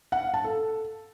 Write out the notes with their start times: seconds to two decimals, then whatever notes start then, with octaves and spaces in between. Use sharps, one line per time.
0.12 F#5
0.23 F5
0.34 A5
0.44 A4